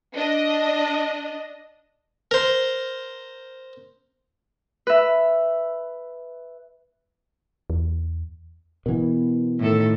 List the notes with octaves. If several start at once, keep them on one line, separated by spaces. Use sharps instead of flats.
D4 D#5
A#4 C5
B4 E5
E2
B2 E3 B3 A#4
A2 D#3 A4